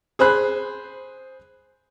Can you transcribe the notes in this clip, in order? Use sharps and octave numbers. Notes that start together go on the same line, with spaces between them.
G#4 C5 B5 F#6